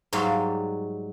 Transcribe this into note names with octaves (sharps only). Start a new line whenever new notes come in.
G#2 F#3 G3 F5